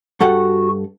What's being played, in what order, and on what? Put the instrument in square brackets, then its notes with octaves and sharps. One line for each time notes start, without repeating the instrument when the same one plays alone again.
[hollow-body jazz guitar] G2 A4 F#5 [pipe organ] F#4